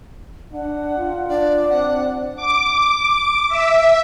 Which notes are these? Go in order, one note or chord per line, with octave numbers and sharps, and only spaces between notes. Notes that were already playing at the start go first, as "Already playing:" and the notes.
D4 F#5
F4
D4 D5
C4 F#5
D6
E5